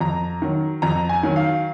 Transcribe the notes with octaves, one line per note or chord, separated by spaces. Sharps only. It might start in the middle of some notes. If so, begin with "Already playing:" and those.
F2 A#5
D#3 F#3
F2 A#5
G#5
D#3 F#3
F5